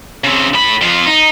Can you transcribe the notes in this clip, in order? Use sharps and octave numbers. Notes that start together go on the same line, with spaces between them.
C#3 C4
A2 B5
F2 F4
D#4